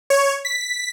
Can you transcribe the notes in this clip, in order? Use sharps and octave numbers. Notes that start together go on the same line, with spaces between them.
C#5
B6